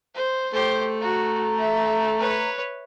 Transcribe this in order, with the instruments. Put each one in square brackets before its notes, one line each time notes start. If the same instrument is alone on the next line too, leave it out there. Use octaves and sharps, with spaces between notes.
[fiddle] C5
[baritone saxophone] A3 [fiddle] G4 C5
[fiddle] F#4 [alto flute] A#5
[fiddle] E5
B4 C#5